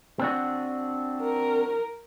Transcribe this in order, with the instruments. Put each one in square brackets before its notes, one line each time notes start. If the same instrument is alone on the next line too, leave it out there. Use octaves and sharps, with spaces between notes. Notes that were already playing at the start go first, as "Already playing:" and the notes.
[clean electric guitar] C4 D4 F#4
[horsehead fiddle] A#4